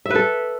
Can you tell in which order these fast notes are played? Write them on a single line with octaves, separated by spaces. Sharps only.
E5 B4 A4